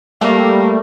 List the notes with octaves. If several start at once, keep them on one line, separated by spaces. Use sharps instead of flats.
G3 A3 A#3